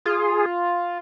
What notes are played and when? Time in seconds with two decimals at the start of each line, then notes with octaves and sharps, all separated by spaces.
0.05 F4 G#4